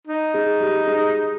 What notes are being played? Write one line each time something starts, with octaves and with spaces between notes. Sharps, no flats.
D#4
G#3
G3
G#3